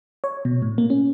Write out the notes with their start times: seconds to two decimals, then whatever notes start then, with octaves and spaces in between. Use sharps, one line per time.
0.24 C#5
0.45 B2
0.62 A2
0.78 A#3
0.90 C#4